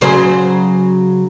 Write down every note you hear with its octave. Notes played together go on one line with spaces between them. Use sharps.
C#3 F#3 C5